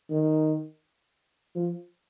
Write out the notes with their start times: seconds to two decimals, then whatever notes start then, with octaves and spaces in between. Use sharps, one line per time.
0.10 D#3
1.55 F3